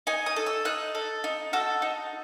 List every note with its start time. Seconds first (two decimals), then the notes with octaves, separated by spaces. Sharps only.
0.07 D#4 G#5
0.26 D#6
0.36 A4
0.46 E6
0.65 D#4 F#6
0.95 A4
1.24 D#4
1.53 F#4 A4
1.82 D#4